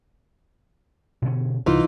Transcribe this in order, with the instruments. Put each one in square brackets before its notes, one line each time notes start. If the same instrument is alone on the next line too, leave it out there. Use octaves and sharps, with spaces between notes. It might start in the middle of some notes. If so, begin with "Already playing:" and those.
[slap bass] B2 D3 C#4
[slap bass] C2 [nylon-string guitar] E3 D#4 F4